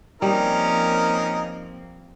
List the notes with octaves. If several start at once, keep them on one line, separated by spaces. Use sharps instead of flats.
F3 G3 A#3 C4 C#4 D#4 A#4